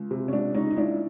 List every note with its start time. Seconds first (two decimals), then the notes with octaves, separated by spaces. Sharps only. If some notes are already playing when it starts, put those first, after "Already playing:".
Already playing: C#2
0.11 C3
0.28 C#4
0.33 C#2 D4
0.54 C#2 C#4 D#4
0.71 D#4
0.77 C#2 D4 E4